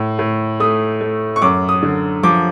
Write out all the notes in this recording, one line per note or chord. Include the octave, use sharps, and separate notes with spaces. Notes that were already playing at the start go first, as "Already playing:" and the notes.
Already playing: A2
A2
A3 D#6
A3
C#6
F#2 D6
D#6
D3
F3 D6